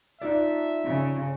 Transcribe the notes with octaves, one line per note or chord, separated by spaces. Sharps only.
D4 D#4 F4 A4 D5 E5 F#5
C#3